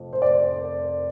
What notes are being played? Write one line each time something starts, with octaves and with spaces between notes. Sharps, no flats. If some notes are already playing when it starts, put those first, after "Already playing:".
Already playing: F1 F2
C5
D5